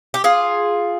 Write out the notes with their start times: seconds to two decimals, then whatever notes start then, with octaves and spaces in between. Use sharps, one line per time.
0.14 G4
0.24 F4 G#4